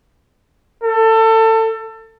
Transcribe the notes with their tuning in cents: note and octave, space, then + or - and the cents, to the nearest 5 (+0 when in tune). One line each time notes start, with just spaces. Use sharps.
A4 +25